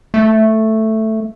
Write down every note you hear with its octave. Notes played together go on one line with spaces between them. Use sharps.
A3